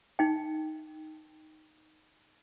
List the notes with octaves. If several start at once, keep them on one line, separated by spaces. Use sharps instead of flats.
D#4 G5